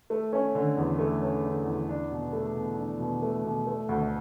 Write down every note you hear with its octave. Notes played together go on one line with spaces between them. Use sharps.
A3
C#4
D3
E2
A3
C#4
D3
E2
D4
B2
A3
B2
D4
B2
A3
B2
A3
D2